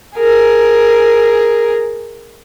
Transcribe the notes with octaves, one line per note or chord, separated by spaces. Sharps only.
G#4 A#4